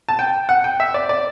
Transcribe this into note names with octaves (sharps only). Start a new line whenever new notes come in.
A5
G5
F#5
G5
E5
D5
D5